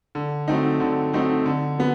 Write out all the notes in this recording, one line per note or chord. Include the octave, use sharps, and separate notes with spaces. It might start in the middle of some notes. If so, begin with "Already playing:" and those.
D3
F#3 A3 C4 D#4
D3
F#3 A3 C4 D#4
D3
F#3 B3